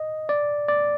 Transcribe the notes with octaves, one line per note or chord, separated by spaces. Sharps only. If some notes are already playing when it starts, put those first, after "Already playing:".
Already playing: D#5
D5
D5